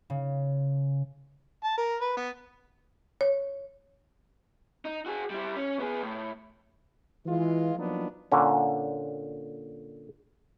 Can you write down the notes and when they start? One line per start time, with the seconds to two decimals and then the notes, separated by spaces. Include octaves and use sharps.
0.10 C#3
1.64 A5
1.78 A#4
2.01 B4
2.17 B3
3.21 C#5
4.85 D#4
5.06 F#4 G#4
5.30 G3 E4
5.56 C#4
5.79 B3 G#4
6.01 A2
7.26 E3 G#3 F4
7.76 F3 F#3 A#3 B3 D4 D#4
8.32 A#2 D3 C#4